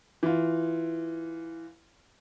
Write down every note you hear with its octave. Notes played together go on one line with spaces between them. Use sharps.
E3 F4